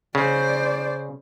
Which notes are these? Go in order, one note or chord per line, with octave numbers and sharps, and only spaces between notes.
C#3 C5 D5